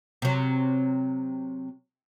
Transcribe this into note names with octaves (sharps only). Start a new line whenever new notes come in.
C3 F#3